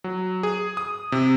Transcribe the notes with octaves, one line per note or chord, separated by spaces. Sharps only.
F#3
G#4
D#6
C3